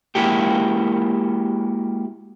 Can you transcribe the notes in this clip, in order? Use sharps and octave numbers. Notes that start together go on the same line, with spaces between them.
G#3 A#3 E4 F#4 G4